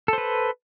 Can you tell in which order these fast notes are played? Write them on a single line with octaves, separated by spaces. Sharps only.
A4 C5 B4